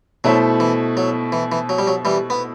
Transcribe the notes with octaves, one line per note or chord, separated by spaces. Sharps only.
B2 F#3 A3 E4 A4 C5
E3
F#3
E3
E3
F#3
G3
F#3
E3 G3
B3